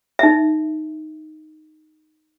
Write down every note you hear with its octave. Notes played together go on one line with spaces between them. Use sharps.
D#4 E5